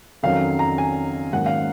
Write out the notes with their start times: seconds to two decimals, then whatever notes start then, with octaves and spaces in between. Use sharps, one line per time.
0.23 F2 D#3 F#3 C#4 F5
0.59 A#5
0.78 G#5
1.33 G#2 D#3 F#3 A#3 C#4 F#5
1.46 F5